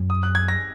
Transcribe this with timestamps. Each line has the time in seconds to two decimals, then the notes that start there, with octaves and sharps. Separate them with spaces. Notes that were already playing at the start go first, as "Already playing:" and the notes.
Already playing: F#2
0.10 D#6
0.23 F#6
0.35 G#6
0.48 A#6